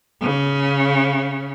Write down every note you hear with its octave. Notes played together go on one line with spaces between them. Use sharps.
C#3